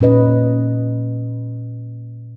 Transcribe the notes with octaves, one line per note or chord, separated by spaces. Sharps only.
A#2 C#4 B4 D#5